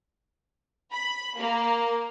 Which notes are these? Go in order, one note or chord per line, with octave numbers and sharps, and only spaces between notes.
B5
A#3